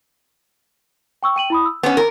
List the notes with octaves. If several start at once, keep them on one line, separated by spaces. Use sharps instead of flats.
G5 C#6 E6
G5 D#7 F#7
E4 B5 D#6
E6
B3 C#4
A#4